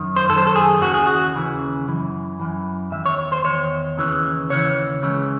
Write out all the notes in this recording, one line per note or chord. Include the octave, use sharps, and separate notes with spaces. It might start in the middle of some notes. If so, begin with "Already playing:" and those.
Already playing: F#2 D#3
C5
F#2 D#3 A4
C5
A4
G#4
D#2 C#3 E3 F#4
G#4
F#4
D#2 C#3 E3
F#2 E3
F#2 E3
E2 D#3 E5
C#5
C5
E2 D#3 C#5
D#2 C#3 E3
D#2 C#3 E3 C#5
C#2 C#3 E3